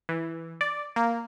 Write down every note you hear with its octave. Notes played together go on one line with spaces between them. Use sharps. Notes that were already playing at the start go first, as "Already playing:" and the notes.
E3
D5
A#3